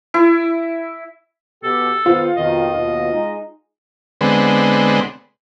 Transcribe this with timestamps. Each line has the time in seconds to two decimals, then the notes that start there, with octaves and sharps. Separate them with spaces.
0.14 E4
1.63 B2 G4 A4
2.06 D#3 B3 F4 C5
2.37 F2 B2 D#3 D#5
2.75 D#2 B2
3.13 G#3 D#4
4.21 D3 G#3 B3 C4